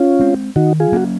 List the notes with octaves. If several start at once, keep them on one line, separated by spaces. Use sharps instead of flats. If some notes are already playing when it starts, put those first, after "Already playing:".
Already playing: C#4 F4
G#3 C4
D#3 D#4 F#4
F4 G#4
F#3 A#3 C#4 F#4